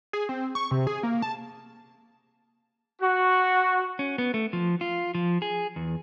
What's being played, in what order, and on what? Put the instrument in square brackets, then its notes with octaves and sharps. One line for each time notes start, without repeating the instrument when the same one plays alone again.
[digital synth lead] G#4
C4
C#6
C3
G#4
A#3
A5
[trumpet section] F#4
[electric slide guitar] C#4
B3
A3
F3
F4
F3
G#4
E2